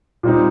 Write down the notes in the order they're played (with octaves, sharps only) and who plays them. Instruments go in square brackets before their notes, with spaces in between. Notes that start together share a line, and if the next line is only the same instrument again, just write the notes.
[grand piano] A#2 G3 C4 D#4